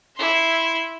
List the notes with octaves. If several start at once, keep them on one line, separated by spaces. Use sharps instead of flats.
E4 C6